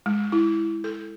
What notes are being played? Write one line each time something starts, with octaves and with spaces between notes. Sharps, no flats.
G#3
E4
A4